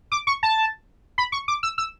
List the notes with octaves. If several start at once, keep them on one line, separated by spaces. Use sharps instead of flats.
D6
C#6
A5
B5
C#6
D6
E6
E6